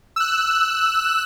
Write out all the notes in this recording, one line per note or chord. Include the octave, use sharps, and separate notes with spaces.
E6 F#6